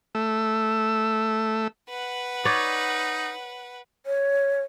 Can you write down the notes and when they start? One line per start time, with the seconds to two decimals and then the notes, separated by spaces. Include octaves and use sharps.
0.15 A3 E6
1.89 B4 F#5
2.45 D#4 C#5 D5
4.06 C#5